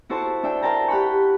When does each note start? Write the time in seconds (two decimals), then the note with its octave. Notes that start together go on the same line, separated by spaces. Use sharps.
0.09 E4 F#4 A4 C5 A5 C#6
0.43 D4 E5 G5
0.62 A#4 C5 G5 A5 A#5
0.88 G4 F#5 G5 B5 C#6